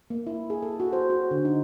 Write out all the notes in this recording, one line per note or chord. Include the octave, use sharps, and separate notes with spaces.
A#3
E4
G#4
A4
F#4
C5
F#4
D3
D#4